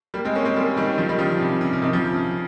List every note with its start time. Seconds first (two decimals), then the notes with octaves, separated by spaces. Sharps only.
0.14 G3 A#3
0.25 G#3 C4
0.35 A#3 C#4
0.45 G#3 C4
0.56 G3 A#3
0.77 D#3 G3
0.98 C#3 F3
1.09 D#3 G3
1.19 C#3 F3
1.30 C#3
1.40 C3
1.61 C#3
1.73 C#3
1.82 C3 D#3
1.93 C#3 F3
2.14 C#3